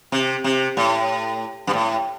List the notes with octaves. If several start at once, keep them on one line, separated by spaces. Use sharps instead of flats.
C3
C3
A2
G2
A2